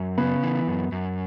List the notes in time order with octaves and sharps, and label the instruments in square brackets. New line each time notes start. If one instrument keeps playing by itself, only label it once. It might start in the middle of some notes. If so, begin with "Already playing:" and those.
Already playing: [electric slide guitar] F#2
[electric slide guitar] C#3 [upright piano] B3
[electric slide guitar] E3
F#2
F#2